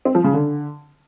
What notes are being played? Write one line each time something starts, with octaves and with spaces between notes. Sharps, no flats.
C4
F3
C#3
D3